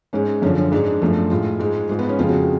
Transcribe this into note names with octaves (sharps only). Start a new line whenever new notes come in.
G#2 G#3 C#4
F#2 D3 F3 C#4
C#4
G#2 G#3 D4
F#2 F3 A3
A2 G#3 F4
G#2 G#3
G#2 G#3 F4
B3
C#4
F2 C#3 G#3 F4
F#4